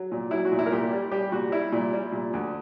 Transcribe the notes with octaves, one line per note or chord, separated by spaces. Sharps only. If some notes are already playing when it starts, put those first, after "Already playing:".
Already playing: F#3
A#2
F#3 E4
F#4
A#2
E4
A#4
A#2 G4
G3
G3 G4
A#2 F#4
G3 E4
A#2
G3
A#2
D2